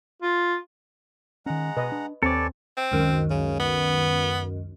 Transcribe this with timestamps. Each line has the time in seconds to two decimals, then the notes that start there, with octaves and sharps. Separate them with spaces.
0.22 F4
1.46 D#3 G#3 C#4 F#5 A#5
1.77 B2 B4 D#5
1.92 D4
2.23 D#2 C4 A4 B4 C#5 D5 G#5
2.77 C4
2.92 C#2 F#2 D#3
3.31 C#3
3.60 B3